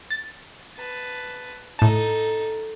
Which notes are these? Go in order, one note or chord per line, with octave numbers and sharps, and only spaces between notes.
A6
B4 A5
A2 D#4 A4 A5